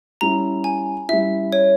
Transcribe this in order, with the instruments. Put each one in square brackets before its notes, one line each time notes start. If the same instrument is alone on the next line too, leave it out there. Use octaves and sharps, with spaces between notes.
[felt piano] G3 C#4 E4 [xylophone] A#5
[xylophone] G#5
[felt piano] G3 C#4 E4 [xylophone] E5
[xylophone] C#5